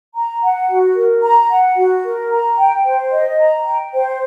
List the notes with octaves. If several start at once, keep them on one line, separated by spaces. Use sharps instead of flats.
A#5
F#5
F#4
A#4
A#5
F#5
F#4
A#4
A#5
G5
C5
D#5
A#5
G5
C5